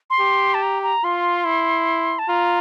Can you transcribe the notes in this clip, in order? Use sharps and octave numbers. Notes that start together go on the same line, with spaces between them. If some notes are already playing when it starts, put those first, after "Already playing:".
C6
G4
A5
A#5
A#5
F4 C6
E4
A5
F4 A#5